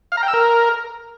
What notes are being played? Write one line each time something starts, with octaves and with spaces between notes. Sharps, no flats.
F5
A#5
G5
E6
A#4